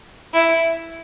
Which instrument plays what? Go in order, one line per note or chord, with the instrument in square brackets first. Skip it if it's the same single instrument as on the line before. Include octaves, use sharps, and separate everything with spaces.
[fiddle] E4